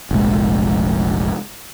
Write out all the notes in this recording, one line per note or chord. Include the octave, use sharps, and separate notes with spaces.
F1 A#1 G#3